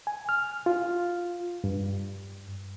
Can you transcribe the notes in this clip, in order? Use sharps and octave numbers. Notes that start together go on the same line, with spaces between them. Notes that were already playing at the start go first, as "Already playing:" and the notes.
G#5
F6
F4
G2